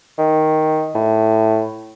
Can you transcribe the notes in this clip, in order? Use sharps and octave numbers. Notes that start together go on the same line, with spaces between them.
D#3
A2